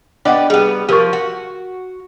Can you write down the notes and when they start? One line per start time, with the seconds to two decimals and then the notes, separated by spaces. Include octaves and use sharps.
0.25 B3 D4 G4 D5 D#5 F#5
0.50 G3 B3 G#4
0.89 F3 G4 A#4 C#6
1.13 F#4